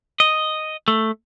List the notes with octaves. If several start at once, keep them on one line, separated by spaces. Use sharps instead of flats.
D#5
A3